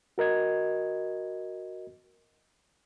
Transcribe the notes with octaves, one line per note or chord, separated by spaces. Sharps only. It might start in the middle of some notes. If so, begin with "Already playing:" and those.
F#4 A#4 D#5 G#6